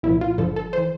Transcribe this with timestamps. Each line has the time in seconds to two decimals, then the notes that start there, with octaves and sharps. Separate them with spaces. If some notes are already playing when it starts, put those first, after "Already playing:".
0.03 C2 A#2 F3 E4
0.21 F4
0.38 G1 G2 D3 F3 A4
0.56 A4
0.73 E3 C5